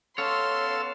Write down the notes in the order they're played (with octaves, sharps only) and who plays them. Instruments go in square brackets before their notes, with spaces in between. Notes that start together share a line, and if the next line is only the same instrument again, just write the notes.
[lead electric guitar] B3 C#5 [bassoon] C#4 [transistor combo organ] A4 F5 E6 [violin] C6